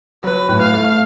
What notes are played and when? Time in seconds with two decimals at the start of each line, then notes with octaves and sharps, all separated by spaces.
0.24 F#3 B4
0.49 A2
0.61 F5
0.74 A3